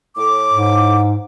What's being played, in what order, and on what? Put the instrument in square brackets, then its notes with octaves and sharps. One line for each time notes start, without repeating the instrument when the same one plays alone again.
[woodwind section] A2 D6
[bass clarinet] G#2